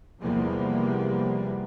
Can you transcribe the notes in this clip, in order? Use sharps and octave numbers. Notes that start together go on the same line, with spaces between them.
E2 C3 F3 G3 A#3 B3